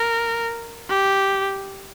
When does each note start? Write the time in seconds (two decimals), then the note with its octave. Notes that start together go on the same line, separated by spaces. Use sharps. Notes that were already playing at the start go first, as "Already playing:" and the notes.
Already playing: A#4
0.89 G4